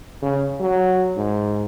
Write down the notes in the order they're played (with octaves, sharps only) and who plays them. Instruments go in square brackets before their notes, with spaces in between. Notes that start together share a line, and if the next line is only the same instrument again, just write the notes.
[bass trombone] C#3
F#3
G#2